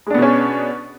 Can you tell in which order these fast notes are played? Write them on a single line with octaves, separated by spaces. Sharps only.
G#3 D4 B3 B2 C#4